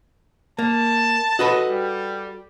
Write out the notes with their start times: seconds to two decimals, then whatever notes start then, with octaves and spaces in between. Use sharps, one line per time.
0.59 A#3 A5
1.39 F#4 A4 B4 D#5
1.69 G3